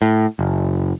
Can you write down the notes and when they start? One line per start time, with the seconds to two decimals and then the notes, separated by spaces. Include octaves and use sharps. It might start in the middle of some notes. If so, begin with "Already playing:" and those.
0.02 A2
0.39 F#1